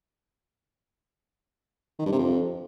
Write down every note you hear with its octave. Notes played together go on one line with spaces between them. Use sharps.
D#3
G2
C3
F2